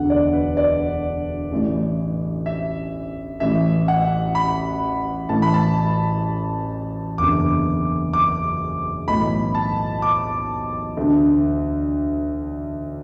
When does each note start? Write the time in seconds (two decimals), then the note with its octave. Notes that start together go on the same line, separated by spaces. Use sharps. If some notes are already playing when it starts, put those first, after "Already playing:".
Already playing: E1 D2 D3 F#5
0.10 D5
0.33 B4
0.57 D5
1.52 A1 A2 E3
2.46 E5
3.40 A1 A2 E3 E5
3.88 F#5
4.35 B5
5.29 A1 A2 E3 A5
5.42 B5
5.54 A5
7.18 F#1 E2 D3 D6
8.13 D6
9.08 B1 A2 E3 B5
9.55 A5
10.02 D6
10.97 D2 D3